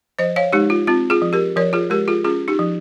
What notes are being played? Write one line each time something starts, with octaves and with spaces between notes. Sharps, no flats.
F3 C5 D#5
C#5 F5
G#3 D#4 G4
F4
C4 F4
F4 G#4
F3
G4 A#4
F3 A#4 C#5
F4 G#4
G#3 G4 A#4
F4 G#4
C#4 F4 G#4
D#4 G4
F3